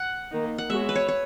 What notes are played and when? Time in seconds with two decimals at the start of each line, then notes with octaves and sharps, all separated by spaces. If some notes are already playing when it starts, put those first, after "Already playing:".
Already playing: F#5
0.31 D#3 A#3 D#4
0.58 F#5
0.70 G#3 B3 F#4 C#5 E5
0.89 B4
0.96 C#5
1.08 C#5